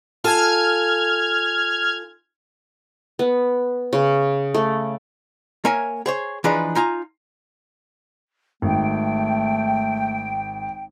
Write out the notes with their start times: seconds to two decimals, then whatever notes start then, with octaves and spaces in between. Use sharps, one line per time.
0.24 F4 A4 G#5 F6 G#6
3.19 B3
3.93 C#3
4.54 A3
5.65 A#3 A#4 C#5 E5 G#5
6.06 G#4 C5 C#5
6.44 E3 F3 D4 D#4 G#4 B4
6.75 D#4 F4 G#5 A#5
8.62 G#1 A3 G5